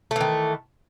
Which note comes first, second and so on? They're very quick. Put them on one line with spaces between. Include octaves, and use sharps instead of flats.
A3 E3 D#3